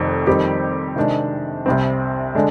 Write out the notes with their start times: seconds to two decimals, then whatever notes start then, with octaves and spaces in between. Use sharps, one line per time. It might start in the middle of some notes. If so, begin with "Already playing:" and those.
Already playing: F1 F2 D#3
0.27 F2 D#3 G3 C4 G4
0.96 C3 D#3 G#3 D4
1.66 C2 C3 G3 C4
2.35 D3 G#3 D4